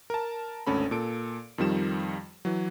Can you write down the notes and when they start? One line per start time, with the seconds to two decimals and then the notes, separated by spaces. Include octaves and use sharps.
0.10 A#4 A5
0.67 G#1 D2 C#4 A4 B5
0.91 A#2 A4 D7
1.58 F2 D#3 F3 G3 E7
2.45 E3 F#3